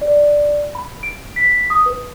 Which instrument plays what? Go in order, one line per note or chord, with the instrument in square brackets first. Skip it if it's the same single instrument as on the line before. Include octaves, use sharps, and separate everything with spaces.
[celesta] D5
B5
D7
B6
D#6
B4